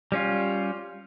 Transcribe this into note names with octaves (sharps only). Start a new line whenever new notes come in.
G3 C#4 F4